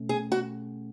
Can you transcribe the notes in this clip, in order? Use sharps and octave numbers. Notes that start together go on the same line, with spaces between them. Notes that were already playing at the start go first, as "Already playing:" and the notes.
Already playing: B2 A3 C#4
G#4
F#4